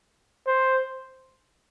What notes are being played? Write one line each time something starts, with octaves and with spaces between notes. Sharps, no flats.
C5